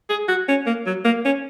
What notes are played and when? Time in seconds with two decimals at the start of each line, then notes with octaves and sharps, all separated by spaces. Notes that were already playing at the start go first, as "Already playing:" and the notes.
0.10 G#4
0.28 F#4
0.48 C#4
0.66 A#3
0.86 F#3
1.05 A#3
1.25 C#4